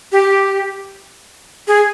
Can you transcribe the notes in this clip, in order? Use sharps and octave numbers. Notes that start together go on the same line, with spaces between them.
G4
G#4